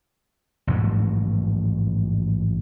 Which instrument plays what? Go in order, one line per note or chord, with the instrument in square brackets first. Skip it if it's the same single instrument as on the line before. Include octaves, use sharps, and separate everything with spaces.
[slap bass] A1 G#2 F3 F#3